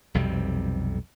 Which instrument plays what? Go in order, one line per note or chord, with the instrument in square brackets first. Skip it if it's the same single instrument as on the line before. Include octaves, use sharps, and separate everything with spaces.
[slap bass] B1 F2 C3 G3